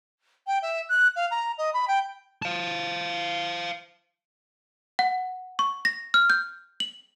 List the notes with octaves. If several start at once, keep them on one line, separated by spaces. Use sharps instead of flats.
G5
E5
F#6
F5
A#5
D#5
B5
G5
F5 A5
F#5
C#6
A#6
F6
G6
F#7